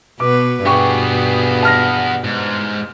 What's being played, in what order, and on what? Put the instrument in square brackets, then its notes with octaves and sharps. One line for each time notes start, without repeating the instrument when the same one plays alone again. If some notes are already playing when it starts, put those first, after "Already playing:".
[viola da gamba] B2 B3 B4 [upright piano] D6
[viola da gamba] G2 B2 [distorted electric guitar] B3 G#4 [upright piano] G5 C#6
[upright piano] A5 F6 A#6
[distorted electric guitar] G#2